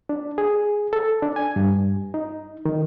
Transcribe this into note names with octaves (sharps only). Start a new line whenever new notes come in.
D4
G#4
A4
D4
G#5
G2
D#4
D#3